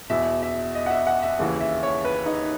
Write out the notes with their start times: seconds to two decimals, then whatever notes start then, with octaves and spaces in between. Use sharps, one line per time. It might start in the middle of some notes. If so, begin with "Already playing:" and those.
0.10 E2 B2 E5
0.42 E5
0.75 D#5
0.86 F#5
0.90 E5
1.07 F#5
1.23 E5
1.39 D#2 C#3 E3
1.60 E5
1.83 C#5
2.05 B4
2.26 D#4